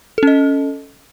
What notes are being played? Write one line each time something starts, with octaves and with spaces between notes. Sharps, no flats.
C#4 A4 D#5